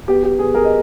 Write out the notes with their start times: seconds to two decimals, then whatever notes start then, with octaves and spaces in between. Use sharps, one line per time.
0.08 B3 G4
0.23 G4
0.39 B3 G#4
0.55 G#4 A#4
0.64 D#5